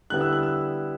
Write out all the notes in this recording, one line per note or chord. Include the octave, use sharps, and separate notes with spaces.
D3 G3 B3 E4 F#6
E6
F#6
E6